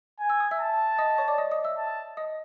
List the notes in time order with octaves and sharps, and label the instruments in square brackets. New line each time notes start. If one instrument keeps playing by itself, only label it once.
[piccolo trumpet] G#5
[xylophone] E6
D#6
E5 E6
[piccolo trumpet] A5
[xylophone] D#5 D#6
C#5 C#6
D5 D6
D#5 D#6
D#5 D#6
E5 E6
[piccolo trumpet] A5
[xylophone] D#5 D#6